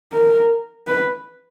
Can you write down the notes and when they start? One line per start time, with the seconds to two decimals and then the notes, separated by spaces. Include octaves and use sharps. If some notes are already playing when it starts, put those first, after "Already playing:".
0.13 A#4
0.87 B4